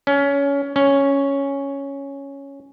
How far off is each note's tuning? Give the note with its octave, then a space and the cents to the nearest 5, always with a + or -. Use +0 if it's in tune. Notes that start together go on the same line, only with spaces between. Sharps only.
C#4 +20
C#4 +0